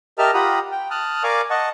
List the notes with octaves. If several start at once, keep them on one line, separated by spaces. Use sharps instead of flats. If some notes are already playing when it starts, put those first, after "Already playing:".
G4 A#4 D#5 E5 A5 F6
F4 G4 F#5 A#5 B5 D#6
G5
A5 D#6 F6 F#6
A#4 D5 F5 G#5 C#6 D6
D#5 F#5 A5 C#6